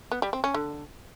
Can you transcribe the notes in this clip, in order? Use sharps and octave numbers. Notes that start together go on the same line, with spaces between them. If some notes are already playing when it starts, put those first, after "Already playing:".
B3
G3
C4
C#4
D3